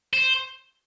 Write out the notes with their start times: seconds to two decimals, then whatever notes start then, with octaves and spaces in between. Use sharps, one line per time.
0.14 C5